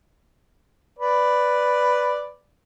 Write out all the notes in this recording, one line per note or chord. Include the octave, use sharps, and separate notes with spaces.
B4 D5